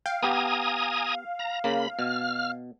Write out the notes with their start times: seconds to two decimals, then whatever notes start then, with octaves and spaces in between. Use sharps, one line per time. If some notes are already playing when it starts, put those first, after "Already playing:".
0.06 F5 G5
0.23 B3 G4 G#5 A#5 D#6
1.39 A#5
1.64 C#3 A#3 B5
1.99 B2 F6